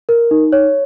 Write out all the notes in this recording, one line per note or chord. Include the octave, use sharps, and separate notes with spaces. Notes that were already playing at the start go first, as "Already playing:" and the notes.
A#4
D#4
C#5